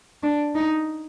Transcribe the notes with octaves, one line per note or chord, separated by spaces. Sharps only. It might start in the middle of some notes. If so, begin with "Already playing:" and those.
D4
D#4